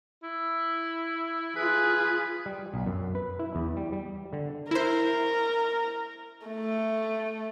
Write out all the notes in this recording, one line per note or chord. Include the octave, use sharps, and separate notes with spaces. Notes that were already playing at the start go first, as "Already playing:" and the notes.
E4
F4 G#4 B4
G3
B1
F#2
B4
E4
E2
G3
G3
D3
E4 A#4 C5
A3